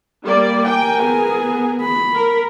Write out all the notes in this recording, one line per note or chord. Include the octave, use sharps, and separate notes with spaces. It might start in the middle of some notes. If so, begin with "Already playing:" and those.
G3 A#3 D5
A#4 G5 G#5
B3 G#4
B5
A#4